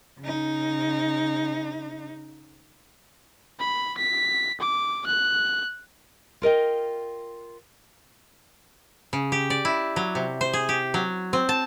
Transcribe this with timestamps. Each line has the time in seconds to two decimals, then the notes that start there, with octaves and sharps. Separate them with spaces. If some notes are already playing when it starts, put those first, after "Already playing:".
0.20 C#3 D#4
3.60 B5
3.98 B6
4.61 D6
5.07 F#6
6.42 F4 A#4 D#5 G5
9.13 C#3
9.32 G4
9.50 D5
9.65 E4
9.96 F#3
10.15 C3
10.41 C5
10.53 G#4
10.69 G4
10.94 F#3
11.33 C4
11.49 A5